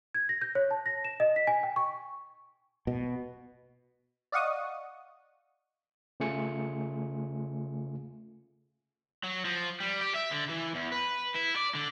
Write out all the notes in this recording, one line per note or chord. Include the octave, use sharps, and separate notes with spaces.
G#6
A#6
G6
C#5
A5
A#6
E7
D#5
B6
G#5
G5
C#6
B2
D5 D#5 F5 F#5 C#6 D#6
C#3 A3 F4 G#5 C#7
F#3
F3
G3
G4
E5
D3
E3
E2
B4
E4
D5
D3